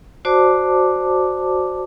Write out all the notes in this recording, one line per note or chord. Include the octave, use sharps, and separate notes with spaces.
F#4 C5 D5 A5 D6